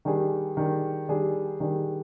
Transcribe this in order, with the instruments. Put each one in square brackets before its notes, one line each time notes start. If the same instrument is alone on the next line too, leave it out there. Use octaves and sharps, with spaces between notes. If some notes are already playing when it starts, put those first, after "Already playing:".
[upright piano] D#3 G3 D4 G#4
D#3 G3 D4 G#4
D#3 G3 D4 G#4
D#3 G3 D4 G#4